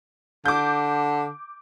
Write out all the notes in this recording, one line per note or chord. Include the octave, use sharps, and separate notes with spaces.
D3 D6 G6